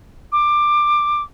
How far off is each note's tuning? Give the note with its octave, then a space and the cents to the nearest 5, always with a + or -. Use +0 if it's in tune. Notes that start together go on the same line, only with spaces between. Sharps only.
D6 +15